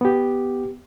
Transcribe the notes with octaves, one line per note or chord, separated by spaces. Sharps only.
B3 G4